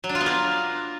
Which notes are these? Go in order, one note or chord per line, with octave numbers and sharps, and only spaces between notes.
F#3
D4
F4
B3
A#3